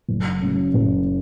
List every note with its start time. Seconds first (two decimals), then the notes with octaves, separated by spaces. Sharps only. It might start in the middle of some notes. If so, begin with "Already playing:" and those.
0.08 F#1
0.41 F#2 C#3
0.74 F#1